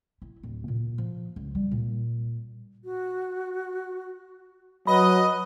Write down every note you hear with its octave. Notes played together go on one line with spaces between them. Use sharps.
E4
D1
A#2
F3
C#2
G3
A#2
F#4
F#3 B4 D#5 B5